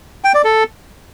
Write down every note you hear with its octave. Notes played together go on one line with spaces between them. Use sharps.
G5
D5
A4